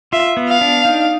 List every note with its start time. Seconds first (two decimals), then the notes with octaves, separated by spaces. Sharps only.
0.13 F4 E5
0.37 B3
0.49 F5
0.61 D4
0.85 D#4